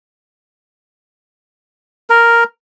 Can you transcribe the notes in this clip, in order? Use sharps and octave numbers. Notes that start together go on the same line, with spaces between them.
A#4